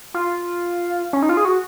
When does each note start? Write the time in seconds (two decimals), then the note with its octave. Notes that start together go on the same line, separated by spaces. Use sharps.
0.14 F4
1.13 C#4
1.22 D#4
1.29 F4
1.37 G#4
1.45 F#4